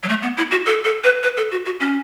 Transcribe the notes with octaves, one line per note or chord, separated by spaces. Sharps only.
F#3
A3
B3
E4
F#4
A4
A4
B4
B4
A4
F#4
F#4
C#4